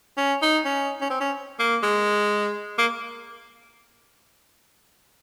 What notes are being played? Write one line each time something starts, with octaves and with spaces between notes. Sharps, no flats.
C#4
D#4
C#4
C#4
C4
C#4
A#3
G#3
A#3